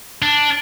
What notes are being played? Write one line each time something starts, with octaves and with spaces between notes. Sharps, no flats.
D4